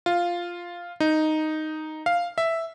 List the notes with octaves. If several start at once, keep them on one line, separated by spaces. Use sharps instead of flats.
F4
D#4
F5
E5